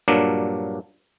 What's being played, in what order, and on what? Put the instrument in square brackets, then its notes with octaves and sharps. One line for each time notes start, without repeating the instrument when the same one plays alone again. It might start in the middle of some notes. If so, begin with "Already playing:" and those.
[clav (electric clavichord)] G2 A#2 F#3 A#3 D4